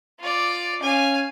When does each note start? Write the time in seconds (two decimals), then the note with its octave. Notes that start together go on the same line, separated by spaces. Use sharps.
0.20 F4 D5
0.82 C#4 F5 G#5